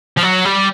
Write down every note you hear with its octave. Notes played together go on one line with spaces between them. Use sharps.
F3
F#3
G3